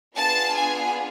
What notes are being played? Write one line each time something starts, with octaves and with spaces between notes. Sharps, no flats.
B3 D4 F4 G#4 A5
G#5